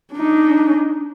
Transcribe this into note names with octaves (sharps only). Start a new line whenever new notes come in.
D4 D#4